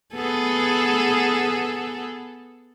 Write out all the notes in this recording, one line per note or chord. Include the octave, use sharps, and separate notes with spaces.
B3 G#4 A4